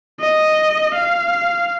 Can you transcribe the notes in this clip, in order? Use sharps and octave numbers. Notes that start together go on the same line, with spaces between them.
D#5
F5